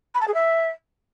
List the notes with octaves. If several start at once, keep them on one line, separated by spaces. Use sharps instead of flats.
B5
A5
G#4
E5